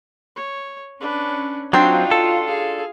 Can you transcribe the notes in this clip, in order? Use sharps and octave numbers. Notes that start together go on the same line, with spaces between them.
C#5
C#4 D4 B4
F#3 C4 D4 D#4 F4 F#4 G5 C6
A4
G#4 F5